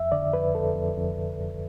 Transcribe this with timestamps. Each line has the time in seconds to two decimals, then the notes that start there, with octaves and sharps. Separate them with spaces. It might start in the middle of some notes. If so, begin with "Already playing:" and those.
Already playing: F2 E5
0.12 D3 D5
0.33 F2 B4
0.54 F2 A4
0.76 F2
0.97 F2
1.19 F2
1.40 F2